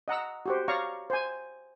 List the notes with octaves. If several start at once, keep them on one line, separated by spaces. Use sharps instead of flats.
D#5 F#5 A#5 E6
F#4 G4 C5
C#5 D5 F5 A#5 C#6
C5 G#5